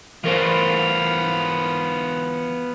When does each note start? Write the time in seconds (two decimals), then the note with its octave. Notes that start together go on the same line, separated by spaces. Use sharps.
0.24 E3 B3 F4 A#4 C5